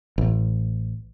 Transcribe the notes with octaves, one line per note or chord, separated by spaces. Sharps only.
A1